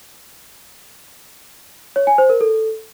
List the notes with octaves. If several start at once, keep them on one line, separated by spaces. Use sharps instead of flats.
C#5
G#5
C5
A#4
A4